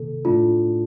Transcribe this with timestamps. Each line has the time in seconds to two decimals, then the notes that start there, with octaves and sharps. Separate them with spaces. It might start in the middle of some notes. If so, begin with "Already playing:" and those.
Already playing: C3 D#3 A#3 A4
0.25 A2 A3 D4 F4